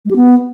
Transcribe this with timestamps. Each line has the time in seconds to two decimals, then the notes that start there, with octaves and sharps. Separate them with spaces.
0.05 G#3
0.11 G4
0.16 B3